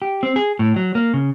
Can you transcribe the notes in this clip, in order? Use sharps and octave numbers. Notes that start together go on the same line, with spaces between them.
G4
C4
G#4
A2
F#3
A#3
C#3